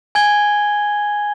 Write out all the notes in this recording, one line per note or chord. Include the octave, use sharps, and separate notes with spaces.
G#5 G#6 G7